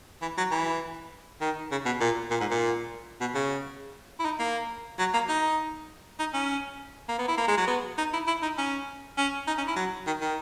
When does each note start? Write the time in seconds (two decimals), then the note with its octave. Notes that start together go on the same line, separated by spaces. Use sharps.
0.22 E3
0.37 F#3
0.51 E3
1.41 D#3
1.71 C#3
1.85 B2
2.00 A#2
2.30 A#2
2.40 G#2
2.50 A#2
3.21 B2
3.35 C#3
4.19 E4
4.25 D#4
4.39 A#3
4.99 F#3
5.14 A#3
5.29 D#4
6.19 D#4
6.34 C#4
7.08 A#3
7.19 B3
7.28 E4
7.38 A#3
7.48 G#3
7.57 F#3
7.67 B3
7.98 D#4
8.13 E4
8.27 E4
8.42 D#4
8.58 C#4
9.18 C#4
9.47 D#4
9.57 C#4
9.67 E4
9.76 F#3
10.07 D#3
10.21 D#3